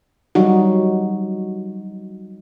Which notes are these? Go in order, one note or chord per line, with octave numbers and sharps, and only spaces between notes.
F#3 G3 D#4 F#4